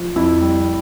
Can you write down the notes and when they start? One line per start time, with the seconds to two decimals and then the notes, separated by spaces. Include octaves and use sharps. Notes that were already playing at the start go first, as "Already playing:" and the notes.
Already playing: F3
0.16 F2 E4
0.42 G3